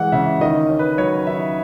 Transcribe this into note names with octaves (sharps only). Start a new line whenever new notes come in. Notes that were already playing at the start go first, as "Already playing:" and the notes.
Already playing: E3 G#3 F#5
C#3 E5
D#3 D#5
C#4
B4
F#3 C#5
D#3 E5